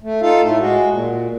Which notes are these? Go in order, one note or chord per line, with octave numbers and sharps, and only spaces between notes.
A3
D#4 F4 A4 F5
A2 A3
G#3 F#4
A#2